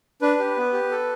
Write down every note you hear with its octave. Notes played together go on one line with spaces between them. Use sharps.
D4 B4
G4
B3
G4
A4